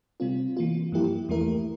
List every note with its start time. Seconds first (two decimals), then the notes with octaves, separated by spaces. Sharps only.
0.20 C3 G3 C4 F4
0.57 E3 A#3 F4
0.92 G2 F3 A#3 E4 G4
1.29 E2 E3 A3 E4 A#4